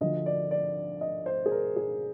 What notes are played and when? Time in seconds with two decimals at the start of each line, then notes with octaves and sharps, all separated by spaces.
0.01 D2 D3 F3 D#5
0.26 D5
0.51 D5
1.01 D#5
1.26 C5
1.46 G#4
1.51 A#4
1.76 G#4